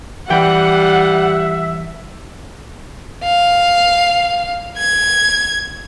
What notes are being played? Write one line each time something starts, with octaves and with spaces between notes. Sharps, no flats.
E3 G3 E5 F#5 G5
F5
G#6